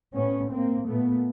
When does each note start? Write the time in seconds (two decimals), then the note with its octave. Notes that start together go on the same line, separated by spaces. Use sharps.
0.15 A2 B3 C#4
0.51 A#3 C4
0.88 A#2 A3 B3